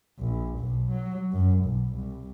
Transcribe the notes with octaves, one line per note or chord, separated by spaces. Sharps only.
A#1
B1
F#3
F#2
B1
C2